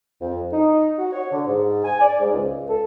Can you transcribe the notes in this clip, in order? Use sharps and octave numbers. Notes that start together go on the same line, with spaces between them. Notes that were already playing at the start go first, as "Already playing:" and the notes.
F2
D#4
F#4
C#5
D3
G#2
G#5
D5
G#2
C#2
A4